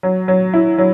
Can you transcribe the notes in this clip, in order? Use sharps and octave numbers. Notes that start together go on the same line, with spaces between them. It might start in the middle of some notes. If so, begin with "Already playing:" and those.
F#3
F#3
E4
F#3